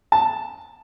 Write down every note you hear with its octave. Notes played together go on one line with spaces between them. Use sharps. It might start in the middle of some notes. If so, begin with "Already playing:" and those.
A5